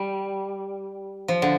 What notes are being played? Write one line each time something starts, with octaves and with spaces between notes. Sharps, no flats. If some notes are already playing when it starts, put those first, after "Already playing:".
Already playing: G3
F3
D3